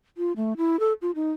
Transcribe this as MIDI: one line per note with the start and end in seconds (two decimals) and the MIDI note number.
0.17 0.32 65
0.36 0.53 57
0.57 0.79 64
0.79 0.93 69
1.02 1.11 65
1.15 1.32 63